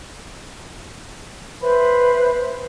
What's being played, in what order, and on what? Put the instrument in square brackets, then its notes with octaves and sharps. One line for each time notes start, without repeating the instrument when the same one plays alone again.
[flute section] B4 C5 E5 B5